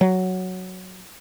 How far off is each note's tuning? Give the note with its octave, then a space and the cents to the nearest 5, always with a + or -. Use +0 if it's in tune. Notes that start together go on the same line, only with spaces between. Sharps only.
F#3 +0